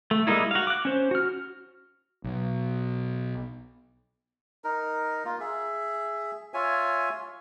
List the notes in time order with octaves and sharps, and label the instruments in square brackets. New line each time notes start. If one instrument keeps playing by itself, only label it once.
[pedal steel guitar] A3
G3 G#3 A#3 D#4 E4
F#4 F5
D6 F#6
C#4 C5
F#4 F6
[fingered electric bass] B1
[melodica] D#4 A#4
A#3 F4
G#4 E5
F4 C#5 E5 G#5